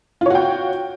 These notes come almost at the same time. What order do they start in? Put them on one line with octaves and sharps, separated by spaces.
F4 C#5 F#4 G5